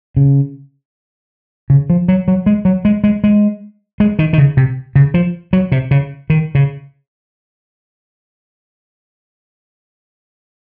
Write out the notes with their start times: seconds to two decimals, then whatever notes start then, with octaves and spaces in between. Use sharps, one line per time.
0.17 C#3
1.70 C#3
1.90 F3
2.08 F#3
2.28 F#3
2.46 G#3
2.65 F#3
2.85 G#3
3.04 G#3
3.24 G#3
4.00 G#3
4.19 D#3
4.33 D#3
4.38 C#3
4.57 C3
4.95 C#3
5.14 F3
5.53 F#3
5.72 C3
5.91 C#3
6.30 D#3
6.55 C#3